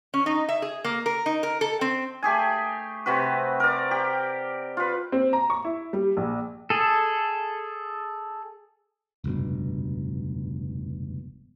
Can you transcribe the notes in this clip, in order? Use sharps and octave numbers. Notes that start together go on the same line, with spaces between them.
C#4
D#4
E5
G#4
A#3
A#4
D#4
A#4
A4
C4
A3 G4 G#4 G#5
C3 C4 F#4 B4
A#4 D5
G4
F4 B4
C4
A#5
C#6
E4
G3
A#1
G#4 A4
F1 C#2 G2 B2